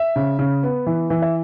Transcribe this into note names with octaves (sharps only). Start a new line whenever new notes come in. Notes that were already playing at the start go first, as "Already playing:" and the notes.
Already playing: E5
C#3
C#3
B3
E3
E3
E5